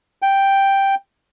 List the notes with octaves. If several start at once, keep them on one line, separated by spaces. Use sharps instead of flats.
G5